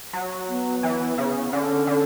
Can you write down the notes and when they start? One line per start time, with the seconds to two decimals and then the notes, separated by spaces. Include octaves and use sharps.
0.13 F#3
0.48 B3
0.83 E3
1.18 C#3
1.52 D3 C#4
1.87 D3